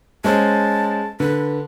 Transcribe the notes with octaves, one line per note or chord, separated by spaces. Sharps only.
G#3 C#4 C5 A5
D3 B4